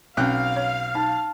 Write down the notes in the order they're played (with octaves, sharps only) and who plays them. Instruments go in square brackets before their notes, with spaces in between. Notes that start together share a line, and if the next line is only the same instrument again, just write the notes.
[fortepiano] B1 G5 F#6 [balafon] C4 C#4 [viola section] F5
[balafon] C#5
[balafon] D#4 [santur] A5